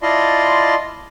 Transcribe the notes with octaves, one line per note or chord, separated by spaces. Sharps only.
E4 F4 D5 D#5 A5 C6